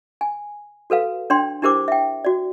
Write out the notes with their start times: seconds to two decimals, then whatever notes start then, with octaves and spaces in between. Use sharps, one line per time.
0.21 G#5
0.90 F#4 A4 B4 F5
1.30 D4 C#5 G5 C6
1.62 D4 E4 G4 A#4 C5 D6
1.88 E5 G5
2.25 F#4 D5